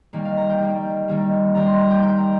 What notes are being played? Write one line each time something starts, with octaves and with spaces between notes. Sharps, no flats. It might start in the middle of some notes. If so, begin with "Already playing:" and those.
D#3 G3 A#3 A#4
F5
A#5
G5
D#3 G3 A#3
D#3 G3 A#3
D#3 G3 A#3 A#5
C6
A#5
G5
D#3 A#3 G5
A#5